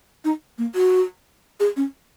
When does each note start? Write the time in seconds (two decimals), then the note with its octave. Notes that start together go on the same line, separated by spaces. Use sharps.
0.25 D#4
0.58 A#3
0.75 F#4
1.60 G#4
1.77 C#4